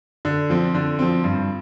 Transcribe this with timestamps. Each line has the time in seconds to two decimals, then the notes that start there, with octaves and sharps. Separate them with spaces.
0.25 D3
0.50 F3 C4
0.74 D3
0.99 F3 C4
1.24 G2